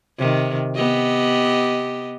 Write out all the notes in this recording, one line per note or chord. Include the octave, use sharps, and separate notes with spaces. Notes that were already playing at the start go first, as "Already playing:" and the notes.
C3 D#3
B3 G4 D#5